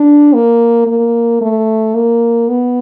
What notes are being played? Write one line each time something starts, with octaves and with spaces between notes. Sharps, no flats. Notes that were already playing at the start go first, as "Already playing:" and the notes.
Already playing: D4
A#3
A#3
A3
A#3
B3